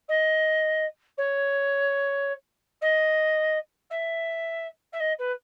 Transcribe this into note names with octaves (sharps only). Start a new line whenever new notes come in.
D#5
C#5
D#5
E5
E5
D#5
B4